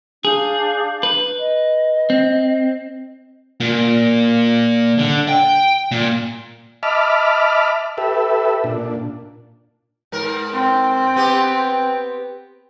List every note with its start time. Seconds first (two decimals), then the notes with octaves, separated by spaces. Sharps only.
0.25 D4 G#4 F5 G6
1.03 B4
1.37 D#5
2.10 C4
3.60 A#2
4.99 D3
5.28 G5
5.92 A#2
6.83 D#5 E5 A5 B5 D6 F6
7.98 G4 A4 B4 E5
8.64 A#2 D4
10.12 G#2 A#4
10.53 C4
11.16 B3 G4